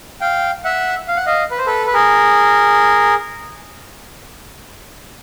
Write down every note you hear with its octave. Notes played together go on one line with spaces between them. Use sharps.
F5 G5
E5 F#5
F5
F#5
D#5 F5
B4
C5
A4 B4
B4
G#4 A#4